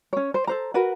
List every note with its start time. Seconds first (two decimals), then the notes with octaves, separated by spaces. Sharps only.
0.13 C#4 C#5
0.34 C5
0.47 A4 C5 A#5
0.74 F#4 A#4 B4 F#5